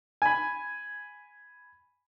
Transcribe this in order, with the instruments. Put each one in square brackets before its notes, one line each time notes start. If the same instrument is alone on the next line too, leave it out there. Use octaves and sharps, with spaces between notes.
[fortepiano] G#5 B5